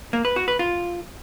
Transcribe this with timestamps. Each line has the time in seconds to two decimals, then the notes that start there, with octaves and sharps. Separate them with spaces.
0.13 A#3
0.25 B4
0.36 F#4
0.48 B4
0.59 F4